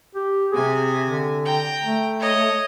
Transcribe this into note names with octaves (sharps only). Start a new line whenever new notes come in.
G4
C3 G#4 G#5
D3
G5 A#5
A3
C#5 D#5